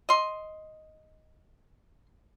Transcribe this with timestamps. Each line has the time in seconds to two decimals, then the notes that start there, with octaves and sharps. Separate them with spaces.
0.09 D#5 C6